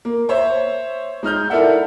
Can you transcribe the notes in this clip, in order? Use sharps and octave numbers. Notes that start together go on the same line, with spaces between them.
A#3
C5 C#5 E5
G#3 D#4 F6 G6
E4 A4 A#4 D5 E5 F#5